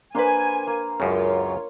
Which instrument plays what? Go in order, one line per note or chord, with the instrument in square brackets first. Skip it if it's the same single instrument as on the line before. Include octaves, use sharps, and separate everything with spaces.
[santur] A#3 C5 B5 [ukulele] D4 B4 [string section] G#5
[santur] A#3
[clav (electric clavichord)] C#2 F#2 C#3 [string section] F4 C#5